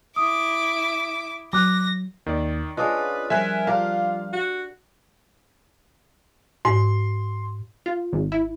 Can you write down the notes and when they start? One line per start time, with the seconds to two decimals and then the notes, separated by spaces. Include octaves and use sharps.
0.16 E4 D6 D#6
1.53 F#3 D6 F#6 A#6
2.26 D#2 D#3 D5
2.77 G#3 C#4 D4 F4 B4 D#5 D#6
3.30 F3 G3 A#4 C5 E5 G#5 F#6
3.67 D4 F4 G4 A#4 F5
4.33 F#4
6.65 G#2 C6
7.86 F4
8.13 G#1
8.32 E4